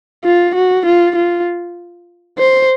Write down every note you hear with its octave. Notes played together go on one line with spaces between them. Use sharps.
F4
F#4
F4
F4
C5